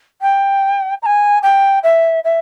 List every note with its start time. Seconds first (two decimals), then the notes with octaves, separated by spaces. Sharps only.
0.21 G5
1.02 A#5
1.06 G#5
1.43 G5
1.83 E5
2.24 E5